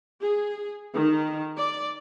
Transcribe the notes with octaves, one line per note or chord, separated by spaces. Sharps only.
G#4
D#3
D5